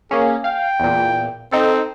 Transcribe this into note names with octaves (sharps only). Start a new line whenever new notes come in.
A#3 C#4 G#4
F5 G5
E2 A#2
C4 D#4 A4